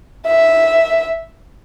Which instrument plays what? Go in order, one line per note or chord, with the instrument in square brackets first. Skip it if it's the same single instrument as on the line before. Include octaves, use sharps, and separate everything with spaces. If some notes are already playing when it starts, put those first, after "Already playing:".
[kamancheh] E5